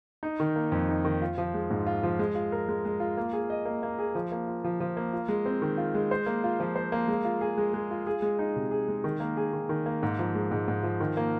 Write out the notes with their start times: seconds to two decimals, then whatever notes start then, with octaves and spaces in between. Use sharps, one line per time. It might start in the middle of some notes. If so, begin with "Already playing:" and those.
0.23 D#4
0.40 D#3
0.56 A#3
0.72 F2
0.89 D#4
1.05 D#3
1.22 F4
1.38 F3
1.54 G#3
1.70 G#2
1.86 F4
2.03 F3
2.19 G#3
2.35 F4
2.52 A#4
2.68 G#3
2.85 G#3
3.00 F4
3.17 A#3
3.33 G#4
3.50 D#5
3.65 A#3
3.83 A#3
3.99 G#4
4.15 F3
4.32 A#3
4.47 F4
4.64 F3
4.80 F3
4.97 A#3
5.13 F4
5.28 G#3
5.46 C4
5.62 D#3
5.77 F4
5.95 G#3
6.11 C5
6.26 A#3
6.44 F4
6.60 F3
6.75 C5
6.92 A#3
7.08 G#3
7.25 F4
7.41 G#4
7.58 G#3
7.74 G#3
7.91 F4
8.07 G#4
8.22 G#3
8.39 D#4
8.56 C3
8.71 G#4
8.88 G#3
9.04 D#3
9.20 A#3
9.37 G#4
9.53 D#3
9.69 D#3
9.86 A#3
10.03 G#2
10.19 F3
10.35 G#3
10.51 G#2
10.68 G#2
10.83 F3
11.00 D#3
11.17 A#3